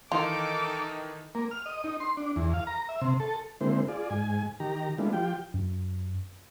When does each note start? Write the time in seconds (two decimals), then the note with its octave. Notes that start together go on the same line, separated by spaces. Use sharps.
0.12 D#3 E3 D#4 F4 A4 D6
1.35 A#3
1.51 F6
1.66 D#5
1.84 D#4
2.00 C6
2.17 D4
2.36 E2
2.54 F5
2.67 A#5
2.89 E5
3.01 C3
3.20 A4
3.61 D3 G#3 A#3 C4 E4 C5
3.88 F4 G#4 D5
4.10 G#2 G#5
4.60 D#3 G4 A#5
4.98 G#3 A3 B3 D4 E4 F4
5.13 F3 F4 G4 G5
5.54 F#2